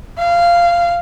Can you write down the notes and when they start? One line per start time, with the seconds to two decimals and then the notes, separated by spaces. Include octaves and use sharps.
0.18 F5